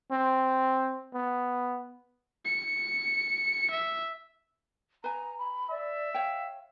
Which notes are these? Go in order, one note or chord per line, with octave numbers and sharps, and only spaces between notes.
C4
B3
C#7
E5
B4 G#5 A#5
B5
D5 E5
C#5 F5 G5